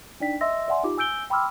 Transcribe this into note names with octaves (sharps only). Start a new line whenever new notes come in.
D4 D#4 D5 G5 B6
D#5 E5 C6 E6 A#6
D5 E5 F#5 G#5 C6
D#4 F4 G4 D6
G#5 E6 G6 D7 G7
G5 B5 C6 D6 E6 F6